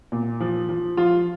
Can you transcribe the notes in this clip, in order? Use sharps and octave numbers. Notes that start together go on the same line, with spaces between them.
A#2
F3
F3
F3 F4